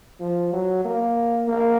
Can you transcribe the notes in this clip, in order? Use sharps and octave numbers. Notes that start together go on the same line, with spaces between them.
F3
F#3
A#3
A#3